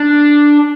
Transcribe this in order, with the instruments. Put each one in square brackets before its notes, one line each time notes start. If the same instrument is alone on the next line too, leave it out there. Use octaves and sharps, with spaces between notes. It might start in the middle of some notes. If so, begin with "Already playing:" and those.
Already playing: [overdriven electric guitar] D4